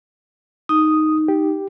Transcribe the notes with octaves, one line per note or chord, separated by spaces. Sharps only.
D#4 D#6
G4